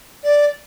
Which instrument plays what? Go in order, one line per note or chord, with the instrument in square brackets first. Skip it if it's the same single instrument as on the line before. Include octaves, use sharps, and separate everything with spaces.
[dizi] D5